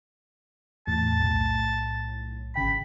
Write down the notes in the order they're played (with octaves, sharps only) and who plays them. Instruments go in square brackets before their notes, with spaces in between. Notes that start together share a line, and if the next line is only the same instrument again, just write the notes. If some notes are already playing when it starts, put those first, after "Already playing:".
[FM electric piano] E2 A2 [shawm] A5
[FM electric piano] B1 A2
[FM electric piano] G#1 C#3 G5 [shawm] B5